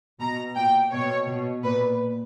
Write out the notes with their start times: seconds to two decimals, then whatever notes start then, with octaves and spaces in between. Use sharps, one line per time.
0.20 B2 A#5
0.56 A#2 G5
0.91 B2 C#5
1.27 B2
1.63 A#2 B4